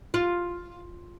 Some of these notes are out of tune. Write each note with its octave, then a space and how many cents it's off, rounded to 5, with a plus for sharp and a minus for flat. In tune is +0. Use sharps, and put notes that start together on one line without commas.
F4 +5